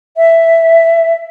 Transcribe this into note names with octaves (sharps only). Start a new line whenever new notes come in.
E5